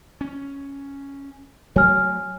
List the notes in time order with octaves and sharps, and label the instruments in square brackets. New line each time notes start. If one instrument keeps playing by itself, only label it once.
[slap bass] C#4
[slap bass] F#3 A3 C4 [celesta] C#5 G#5 F6